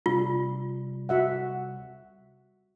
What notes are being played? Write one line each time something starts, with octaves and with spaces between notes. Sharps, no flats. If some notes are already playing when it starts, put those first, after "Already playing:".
C3 G3 F4
F#4 E5 F#5